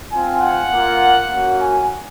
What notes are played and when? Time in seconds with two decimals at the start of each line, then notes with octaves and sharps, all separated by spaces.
0.11 C4 F4 G#5
0.41 F#5
0.71 A#3 F4
1.31 A#3 C#4 F#4
1.61 G#5